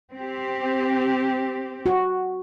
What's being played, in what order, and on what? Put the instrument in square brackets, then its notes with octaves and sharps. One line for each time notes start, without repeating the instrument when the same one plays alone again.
[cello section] C4 G4
[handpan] F#4